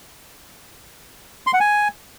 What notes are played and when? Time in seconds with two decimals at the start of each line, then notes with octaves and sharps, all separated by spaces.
1.47 C6
1.54 F#5
1.60 G#5